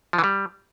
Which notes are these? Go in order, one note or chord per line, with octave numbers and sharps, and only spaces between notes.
F3
E3
G3